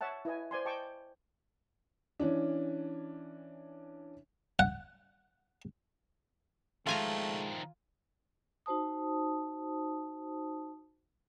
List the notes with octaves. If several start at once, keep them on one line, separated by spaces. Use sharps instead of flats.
C#5 E5 F#5 A5
E4 B4 D#5 G#5
C5 D5 G#5 C6
D#5 G5 A5 C#6 D6
E3 C#4 D4
F#5
D#3 F3 G#3 A3 F4 G#5 A#5
D#4 F#4 C5 A5 D#6